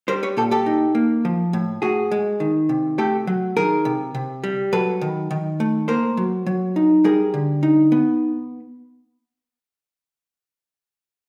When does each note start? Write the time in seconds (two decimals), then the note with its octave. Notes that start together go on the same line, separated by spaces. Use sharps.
0.08 G3 A#4 C5
0.23 B4 C#5
0.37 A#2 G4 A4
0.51 G4 A4
0.66 D#4
0.95 A#3
1.25 F3
1.53 A2
1.82 A2 F#4 G#4
2.11 G#3
2.40 D#3
2.69 C3
2.98 A3 G4 A4
3.27 F#3
3.57 D#3 G#4 A#4
3.85 C3
4.15 C3
4.44 G3
4.73 F#3 A4 B4
5.01 D#3
5.31 D#3
5.60 A3
5.88 A#3 A#4 C5
6.17 F#3
6.46 F#3
6.76 D#4
7.04 G3 G#4 A#4
7.34 D3
7.63 D#4
7.92 B3